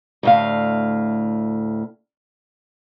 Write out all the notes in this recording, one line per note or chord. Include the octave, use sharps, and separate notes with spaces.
D2 A2 F5